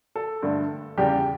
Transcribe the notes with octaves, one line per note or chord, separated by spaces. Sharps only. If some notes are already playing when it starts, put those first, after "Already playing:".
A4
G2 D3 A3
E2 C#3 G3 G4